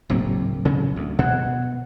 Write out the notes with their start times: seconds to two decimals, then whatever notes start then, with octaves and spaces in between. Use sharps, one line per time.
0.10 F#1 D2 A2 F#3 A#3 C4
0.65 C#3 C#4
0.96 D2
1.19 B2 F#5 F#6 G#6